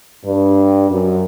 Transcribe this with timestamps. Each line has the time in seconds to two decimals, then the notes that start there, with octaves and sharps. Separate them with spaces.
0.23 G2
0.89 F#2